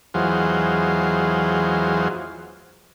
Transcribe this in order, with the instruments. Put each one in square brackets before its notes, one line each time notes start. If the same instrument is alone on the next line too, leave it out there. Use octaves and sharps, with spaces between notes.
[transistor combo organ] E2 F#3 G#3 F4 C5